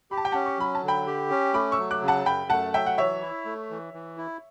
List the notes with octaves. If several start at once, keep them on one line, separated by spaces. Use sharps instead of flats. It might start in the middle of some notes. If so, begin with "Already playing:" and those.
G4 B5
A5
G5
C#4 F#5 A5
C#6
F#3 B5
A5
D3
G5 B5
G4
C#4
A3 B5 D6
C#6 E6
F#3
D6 F#6
C#3
F#5 A5
F#2 G5 B5
A3 F#5 A5
F#3 E5 G5
F#5
E3 C#5 E5
E4
A3
E3
E3
E4